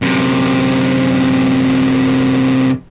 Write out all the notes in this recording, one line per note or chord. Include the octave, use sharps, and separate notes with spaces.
F#2 C3